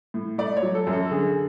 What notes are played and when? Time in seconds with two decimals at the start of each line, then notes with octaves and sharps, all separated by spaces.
0.14 A2
0.38 A3 D5
0.57 C#5
0.62 F#3
0.75 A4
0.87 F#2
0.93 A4
1.11 D3 G#4